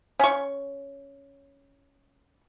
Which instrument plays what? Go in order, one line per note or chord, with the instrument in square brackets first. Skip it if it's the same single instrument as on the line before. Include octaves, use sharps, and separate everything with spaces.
[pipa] C#4 C#6